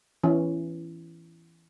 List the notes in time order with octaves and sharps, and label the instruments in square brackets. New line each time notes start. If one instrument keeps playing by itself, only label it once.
[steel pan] E3 C#4